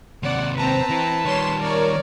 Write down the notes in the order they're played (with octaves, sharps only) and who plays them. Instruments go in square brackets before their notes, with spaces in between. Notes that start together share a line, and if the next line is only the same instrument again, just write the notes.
[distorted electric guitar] D#2 C3 [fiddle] D5 [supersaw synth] F#5
[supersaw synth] C4 A#5 [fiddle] B4 A5
[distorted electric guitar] E3 E4
[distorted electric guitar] D#3 G3 [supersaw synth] C#5 C6 E7
[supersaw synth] A#4 C#5 [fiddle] D5